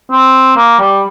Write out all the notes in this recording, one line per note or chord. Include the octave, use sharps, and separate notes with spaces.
C4
A#3
G3